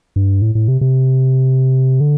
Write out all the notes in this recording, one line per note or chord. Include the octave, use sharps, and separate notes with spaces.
G2
A2
A2
C3
C3
D3